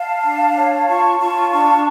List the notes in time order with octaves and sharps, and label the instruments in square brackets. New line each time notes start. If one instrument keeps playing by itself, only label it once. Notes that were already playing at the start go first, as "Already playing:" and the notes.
Already playing: [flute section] F5 A5
D4
C#5
F4 A5 C#6
F4 A5 C#6
D4 A5 C#6